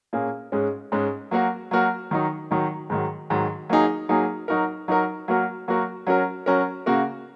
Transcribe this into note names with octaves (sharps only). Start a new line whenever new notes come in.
A#2 A#3 C#4 G#4
G#2 G#3 C#4
G#2 G#3 C#4
F#3 A#3 F#4 A#4
F#3 A#3 F#4 A#4
D#3 F#3 D#4
D#3 F#3 D#4
G#2 D#3 F#3
G#2 D#3 F#3
F#3 A#3 D#4 G#4
F#3 A#3 D#4 G#4
F#3 D#4 F#4 A#4
F#3 D#4 F#4 A#4
F#3 A#3 F#4 A#4
F#3 A#3 F#4 A#4
F#3 C#4 F#4 A#4
F#3 C#4 F#4 A#4
C#3 A#3 F#4 A#4